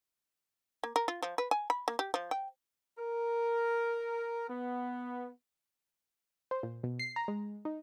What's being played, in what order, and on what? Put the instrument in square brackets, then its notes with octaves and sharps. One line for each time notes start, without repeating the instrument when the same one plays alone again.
[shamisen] A#3
A#4
F4
F3
B4
G#5
B5
A#3
G4
F3
G5
[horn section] A#4
B3
[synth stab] C5
A#2
B2
C7
A#5
G#3
D#4